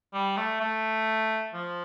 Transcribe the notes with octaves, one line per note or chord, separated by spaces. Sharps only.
G3
A3
A3
F3